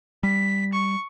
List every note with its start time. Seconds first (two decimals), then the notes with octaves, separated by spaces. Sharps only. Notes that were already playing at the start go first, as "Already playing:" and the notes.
0.23 G3 B6
0.73 C#6